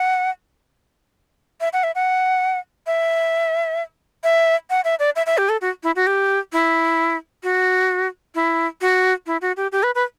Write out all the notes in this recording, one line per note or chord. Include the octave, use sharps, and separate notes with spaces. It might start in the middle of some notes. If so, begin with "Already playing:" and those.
Already playing: F#5
E5
F#5
E5
F#5
E5
E5
F#5
E5
D5
E5
E5
G4
A4
F#4
E4
F#4
G4
E4
F#4
E4
F#4
E4
F#4
G4
G4
B4
B4